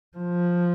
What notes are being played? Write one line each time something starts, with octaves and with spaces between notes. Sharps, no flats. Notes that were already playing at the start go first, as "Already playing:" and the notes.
F3